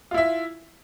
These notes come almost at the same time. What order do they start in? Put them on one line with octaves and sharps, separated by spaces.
F4 E4 E5